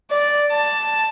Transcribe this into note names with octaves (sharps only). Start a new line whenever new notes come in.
D5
A5